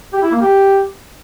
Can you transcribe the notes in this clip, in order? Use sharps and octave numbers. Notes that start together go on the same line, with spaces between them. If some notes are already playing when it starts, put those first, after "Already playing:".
G4
E4
A#3
G4